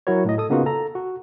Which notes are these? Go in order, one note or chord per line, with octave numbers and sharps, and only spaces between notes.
F#3 E4 F#4 A#4 C#5
A2 D#5
A4 D#6
C#3 A#3 B3 D#4 F4 F#4
A4 A#5
F#4